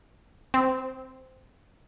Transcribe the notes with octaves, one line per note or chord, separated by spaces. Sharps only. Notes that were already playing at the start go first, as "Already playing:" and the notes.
C4